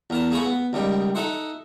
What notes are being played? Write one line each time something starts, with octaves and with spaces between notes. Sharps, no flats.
E2 A#4 A5
A3 G#4 F5 A#5 B5 C#6
B3
C#2 D#3 G3
D#4 A4 E5 F#5 C6